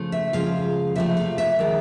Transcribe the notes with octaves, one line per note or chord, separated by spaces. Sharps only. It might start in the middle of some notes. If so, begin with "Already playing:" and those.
Already playing: C#3 F3 A3
E5
C#3 F3 G#3 F5
C3 F3 A3 E5
F5
E5
D#3 G#3